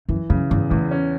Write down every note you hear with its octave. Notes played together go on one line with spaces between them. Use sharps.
F#2 E3
F#2 C#3
E2 G2
E2 A2
C#4